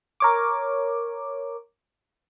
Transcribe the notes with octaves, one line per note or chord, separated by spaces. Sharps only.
A#4 C#5 D6